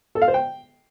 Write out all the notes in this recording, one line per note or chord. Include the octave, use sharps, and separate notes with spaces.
A4
F5
C5
G5